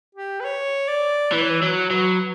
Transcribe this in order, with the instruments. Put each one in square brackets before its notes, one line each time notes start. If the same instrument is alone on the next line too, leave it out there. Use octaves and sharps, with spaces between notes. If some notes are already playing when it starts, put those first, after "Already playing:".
[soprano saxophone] G4
B4
C#5
D5
[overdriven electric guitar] E3 [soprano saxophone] B4
[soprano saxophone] C#5
B4
[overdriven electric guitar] F#3 [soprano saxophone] C#5
[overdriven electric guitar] F#3 [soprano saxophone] B4